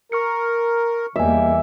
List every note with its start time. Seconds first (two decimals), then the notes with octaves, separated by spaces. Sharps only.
0.12 A#4 C#6 F6 C#7
1.16 E2 G3 A#3 D#5 E5 G#5